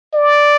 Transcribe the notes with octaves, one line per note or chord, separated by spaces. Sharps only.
D5